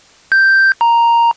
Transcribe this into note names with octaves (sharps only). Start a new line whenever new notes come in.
G6
A#5